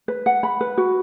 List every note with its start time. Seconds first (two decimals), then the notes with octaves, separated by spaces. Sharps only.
0.08 B4
0.26 F#5
0.43 B5
0.61 B4
0.78 F#4